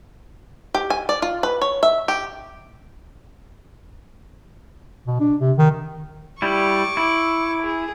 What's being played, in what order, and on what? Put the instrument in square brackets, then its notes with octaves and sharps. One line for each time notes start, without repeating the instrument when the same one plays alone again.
[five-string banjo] G4
G#5
D5
F4
B4
C#5
E5
G4
[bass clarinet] B2
D4
C3
D#3
[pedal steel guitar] G3 E4 [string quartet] C#6 D6
[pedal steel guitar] E4
[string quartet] G#4